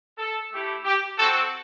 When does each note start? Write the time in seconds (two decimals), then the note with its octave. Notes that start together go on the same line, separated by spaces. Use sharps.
0.18 A4
0.51 A3 E4 G4
0.84 G4
1.17 C4 F#4 A4